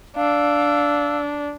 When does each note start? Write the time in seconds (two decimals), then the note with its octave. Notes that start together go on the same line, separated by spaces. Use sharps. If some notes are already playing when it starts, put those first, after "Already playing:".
0.17 D4 F5 E6